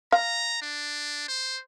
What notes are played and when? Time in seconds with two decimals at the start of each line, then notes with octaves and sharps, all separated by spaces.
0.12 F5 A#5
0.62 D4
1.28 C5